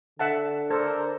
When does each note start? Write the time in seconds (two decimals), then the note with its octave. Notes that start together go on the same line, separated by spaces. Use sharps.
0.19 D3 E5 F#5 A5
0.70 D4 A4 A#4 C5